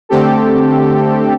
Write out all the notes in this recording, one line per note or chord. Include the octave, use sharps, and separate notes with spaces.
D3 A3 C4 G4 A4